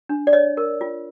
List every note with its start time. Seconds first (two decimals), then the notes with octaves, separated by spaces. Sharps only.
0.09 D4
0.27 D5
0.33 C#5 D#5
0.57 A#4
0.81 F4